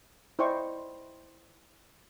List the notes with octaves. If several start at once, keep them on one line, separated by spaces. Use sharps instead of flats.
E4 C5 D5 D#5 G5 C#6